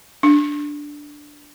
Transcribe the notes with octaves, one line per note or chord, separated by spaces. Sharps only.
D4